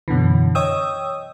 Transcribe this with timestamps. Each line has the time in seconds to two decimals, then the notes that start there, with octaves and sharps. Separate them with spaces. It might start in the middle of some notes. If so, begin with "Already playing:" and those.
0.08 F#2 B2 D3 E3
0.55 C#5 D#5 G5 D#6 E6